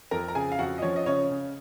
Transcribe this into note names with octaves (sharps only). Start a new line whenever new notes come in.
F2 A#4 A#5
A#5
C#3 G#4 G#5
F5
F2 F#4 F#5
D#5
F3 C#4 C#5
D#5
C#3 C#4 C#5
C#3